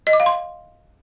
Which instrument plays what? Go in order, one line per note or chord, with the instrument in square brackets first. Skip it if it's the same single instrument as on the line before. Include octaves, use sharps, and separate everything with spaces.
[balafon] D#5
D6
F5
C6